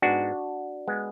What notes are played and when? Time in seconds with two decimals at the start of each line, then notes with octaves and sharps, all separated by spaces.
0.02 G#2 G#3 B3 D4 F#4
0.88 G#3 B3